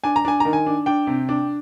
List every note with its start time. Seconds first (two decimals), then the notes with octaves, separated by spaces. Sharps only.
0.04 D4 G#5
0.16 A#5
0.25 D4 G#5
0.40 D#3 A#5
0.53 G#5
0.66 D4
0.86 D4 G5
1.07 C3
1.29 D4